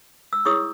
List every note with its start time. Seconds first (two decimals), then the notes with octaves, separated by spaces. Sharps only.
0.33 E6
0.45 E4 G#4 C#5 C#6 D#6